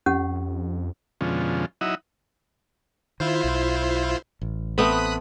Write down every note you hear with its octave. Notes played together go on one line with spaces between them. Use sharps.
F2 C#4 G4 F#5
F2 B2 D3 F3 G#3 C#4
F#3 D#4 E4 D#5 E5 F#5
D#3 E4 F4 C5
B1
A1
A3 B3 C4 B5 D#6 F#6